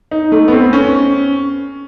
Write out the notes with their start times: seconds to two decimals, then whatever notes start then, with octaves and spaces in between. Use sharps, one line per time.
0.11 D#4
0.32 A3
0.48 B3
0.52 C4
0.73 C#4